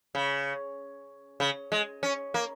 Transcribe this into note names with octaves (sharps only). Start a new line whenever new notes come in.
C#3
C#3
G#3
C#4
A#3